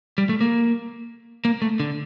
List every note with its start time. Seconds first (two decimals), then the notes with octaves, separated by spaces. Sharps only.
0.18 G3
0.29 A3
0.41 A#3
1.45 A#3
1.62 A3
1.80 D3